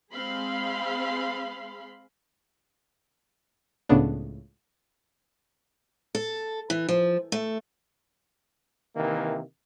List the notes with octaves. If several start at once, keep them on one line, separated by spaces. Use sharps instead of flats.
G#3 C4 G#4 F5 B5 C6
C#2 A2 C#3 B3 D4
A4
E3
F3
A3
C3 D#3 E3 A#3